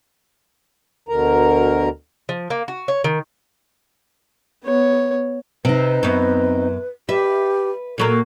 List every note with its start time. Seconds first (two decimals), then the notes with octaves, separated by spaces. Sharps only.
1.09 D2 B2 D3 A#4 A#5
2.29 F3
2.50 A#3
2.68 F#4
2.88 C#5
3.04 D#3
4.65 B3 C#5
5.65 C3 C4 D#4 B4
6.03 F#2 B3
7.09 G4 B4 E5
7.98 A#2 F#3 A#3 A4